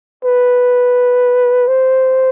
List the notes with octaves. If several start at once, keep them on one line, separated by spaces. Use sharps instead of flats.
B4
C5